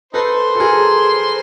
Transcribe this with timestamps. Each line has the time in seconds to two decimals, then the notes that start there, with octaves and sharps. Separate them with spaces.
0.13 D#4 A4 B4 C5
0.55 A4
0.60 G#4 A#4